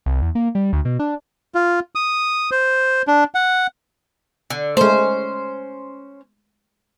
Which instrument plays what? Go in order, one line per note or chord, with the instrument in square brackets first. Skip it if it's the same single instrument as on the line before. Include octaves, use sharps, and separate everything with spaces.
[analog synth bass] C2
E2
A#3
G3
D2
B2
D4
[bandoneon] F4
D#6
C5
D4
F#5
[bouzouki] D3
[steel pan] G#3 A3 [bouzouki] C#4 C5